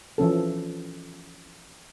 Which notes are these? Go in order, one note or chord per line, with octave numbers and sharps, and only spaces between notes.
E3 F3 C#4 A4